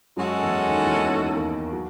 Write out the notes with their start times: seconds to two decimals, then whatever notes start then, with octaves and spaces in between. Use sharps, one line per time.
0.17 F#2 F#3 G#3 C#4 F#4 A4
0.43 E2 E3
0.69 D#2 D#3
0.85 E3
0.95 D#2 D#3
1.34 D#2 D#3
1.72 F#3